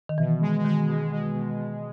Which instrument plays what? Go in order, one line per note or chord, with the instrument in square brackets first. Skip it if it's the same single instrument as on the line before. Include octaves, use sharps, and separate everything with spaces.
[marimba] D#3
[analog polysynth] B2 [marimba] E3
[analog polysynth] G#3
[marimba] D#3 [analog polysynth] G#3
[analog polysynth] B2
G#3
B2
B2